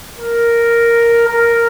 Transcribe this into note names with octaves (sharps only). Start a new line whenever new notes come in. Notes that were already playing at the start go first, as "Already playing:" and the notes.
A#4
A#4